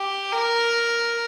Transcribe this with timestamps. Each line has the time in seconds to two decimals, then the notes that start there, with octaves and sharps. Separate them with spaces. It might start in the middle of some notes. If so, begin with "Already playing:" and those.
Already playing: G4
0.32 A#4